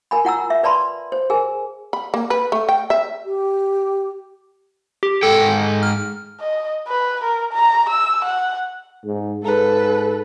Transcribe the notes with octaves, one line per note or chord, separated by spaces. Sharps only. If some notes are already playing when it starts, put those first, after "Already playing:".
A#4 G#5 B5
F4 F#5 A#5 E6
E5
B4 D5 A5 B5 C6
C5
G#4 A#4 G#5
B5
A#3
B4
A3
G5
E5
G4
G4
G#2 A4 G5
F6
D#5
B4
A#4
A#5
E6
F#5
G#2
G#2 A4 B4